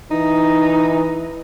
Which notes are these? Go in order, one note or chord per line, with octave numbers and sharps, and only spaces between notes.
E3 D#4